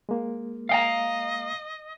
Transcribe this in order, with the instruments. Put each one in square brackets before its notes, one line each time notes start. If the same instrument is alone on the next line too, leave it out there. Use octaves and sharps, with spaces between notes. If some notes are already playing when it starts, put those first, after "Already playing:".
[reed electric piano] G#3 A#3
[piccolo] D#5 [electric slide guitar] F5 G5 A#5